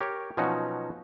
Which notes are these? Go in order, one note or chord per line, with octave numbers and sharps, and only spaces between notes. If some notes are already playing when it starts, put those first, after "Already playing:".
G4 A#4 C#5
B2 F3 F#3 C#4 D#4 F#4